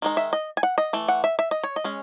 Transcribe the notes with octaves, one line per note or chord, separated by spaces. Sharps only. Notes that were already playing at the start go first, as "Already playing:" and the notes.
D#3 G#3 D#4
E5
D#5
G#5
F#5
D#5
E3 A3
F#5
E5
E5
D#5
C#5
D#5
G#3 C#4